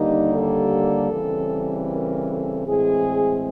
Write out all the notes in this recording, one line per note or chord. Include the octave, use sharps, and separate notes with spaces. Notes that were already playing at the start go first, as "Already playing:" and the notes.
Already playing: D#2 D3 G3 A#3 D#4
A4
C#3 E3 G3 C4
A#4
A4
A2 E3 G#3 C4 G#4